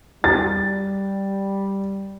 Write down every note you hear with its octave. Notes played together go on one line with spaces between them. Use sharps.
G3 A6